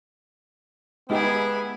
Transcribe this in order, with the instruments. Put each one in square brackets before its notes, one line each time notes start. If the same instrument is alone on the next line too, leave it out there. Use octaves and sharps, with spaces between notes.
[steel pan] G#3 D#4 G4 [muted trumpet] B3 [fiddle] E4 G#4